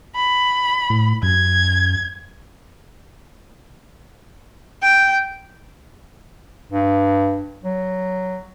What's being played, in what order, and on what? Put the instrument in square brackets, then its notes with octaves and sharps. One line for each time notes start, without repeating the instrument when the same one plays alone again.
[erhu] B5
[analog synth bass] A2
[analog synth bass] F#2 [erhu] G#6
[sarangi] G5
[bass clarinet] G2
F#3